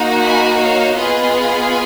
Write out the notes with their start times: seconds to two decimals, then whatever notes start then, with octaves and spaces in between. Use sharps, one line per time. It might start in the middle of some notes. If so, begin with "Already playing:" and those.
Already playing: A#3 D#4 F#4
0.22 G#5 B5
0.58 C#5 F5
0.95 B3 F4 G#4 B4 D#5